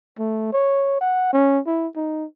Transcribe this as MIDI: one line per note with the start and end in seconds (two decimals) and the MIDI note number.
0.19 0.51 57
0.53 0.96 73
1.01 1.31 78
1.33 1.59 61
1.67 1.88 64
1.96 2.25 63